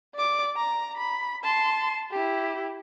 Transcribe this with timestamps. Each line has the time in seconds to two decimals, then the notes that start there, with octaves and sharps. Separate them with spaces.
0.15 D5 D6
0.56 A#5
0.97 B5
1.44 A5 C6
2.12 E4 G4